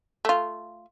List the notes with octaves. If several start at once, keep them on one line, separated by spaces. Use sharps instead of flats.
A3 F4